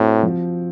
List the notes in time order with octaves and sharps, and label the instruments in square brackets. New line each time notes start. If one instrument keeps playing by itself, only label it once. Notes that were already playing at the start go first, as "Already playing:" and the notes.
Already playing: [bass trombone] A2 [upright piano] C4 F#4
[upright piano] F3